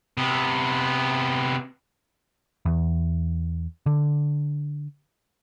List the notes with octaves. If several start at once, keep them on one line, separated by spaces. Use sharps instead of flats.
C3 B3
E2
D3